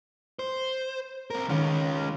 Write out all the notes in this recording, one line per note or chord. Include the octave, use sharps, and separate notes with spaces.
C5
C4 A#4
D#3 G#3 C#4 F5 C#7